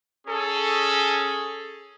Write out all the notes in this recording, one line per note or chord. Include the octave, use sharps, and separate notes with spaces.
C#4 G#4 A4